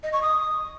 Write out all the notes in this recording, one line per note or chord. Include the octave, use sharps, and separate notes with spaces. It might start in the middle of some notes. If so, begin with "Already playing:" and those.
D#5
C#6
D#6